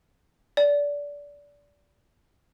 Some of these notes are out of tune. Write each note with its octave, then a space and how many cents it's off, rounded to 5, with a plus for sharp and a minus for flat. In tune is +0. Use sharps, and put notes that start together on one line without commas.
D5 -20